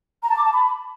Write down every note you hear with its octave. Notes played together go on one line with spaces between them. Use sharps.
A#5
A5
D6
A5
B5